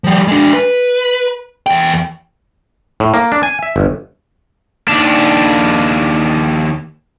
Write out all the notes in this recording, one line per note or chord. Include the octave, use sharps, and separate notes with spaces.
F3 G3
G#3 D4
B4
E2 G5
A2
A#3
D4
G#5
E5
G1
D#2 D4